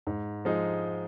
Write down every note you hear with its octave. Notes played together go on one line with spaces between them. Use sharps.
G#2
F3 G#3 D#4